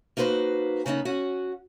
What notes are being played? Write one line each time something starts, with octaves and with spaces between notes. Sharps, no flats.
A#3 D#4 F#4 B4 C5
C#3 A#3 B3 D#4
C#4 F#4 F#5